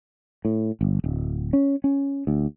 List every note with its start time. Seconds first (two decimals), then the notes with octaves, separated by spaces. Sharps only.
0.45 A2
0.81 G1
1.04 D1
1.53 C#4
1.84 C#4
2.27 D2